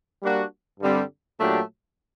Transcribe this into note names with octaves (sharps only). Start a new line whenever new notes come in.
G3 A#3 D4 F#4
G2 D3 G3 C4
A#2 F#3 A3 D4 G4